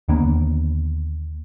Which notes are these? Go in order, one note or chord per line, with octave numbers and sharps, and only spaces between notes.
D#2 D3 A#3 B3